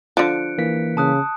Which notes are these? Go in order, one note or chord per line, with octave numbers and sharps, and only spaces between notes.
D3 F3 F#6 C#7 D7
E3 A#3 B6
C#3 A5 D#6 F#6